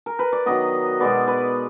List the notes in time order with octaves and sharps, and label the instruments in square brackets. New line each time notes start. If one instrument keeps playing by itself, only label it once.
[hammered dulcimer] A#4
B4
D5
D#3 F#3 B3 D#5
B2 G#3 B3 D5
B4